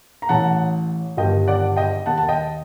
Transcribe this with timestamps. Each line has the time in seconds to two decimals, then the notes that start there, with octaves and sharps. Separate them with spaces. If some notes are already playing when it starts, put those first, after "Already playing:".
0.22 A#5
0.29 A1 A2 F#5 A5
1.17 G1 G2 D#3 D#5 G5
1.48 D5 F#5
1.76 D#5 G5
2.06 D#2 D#3 F#5 A5
2.18 A5
2.29 D#5 G5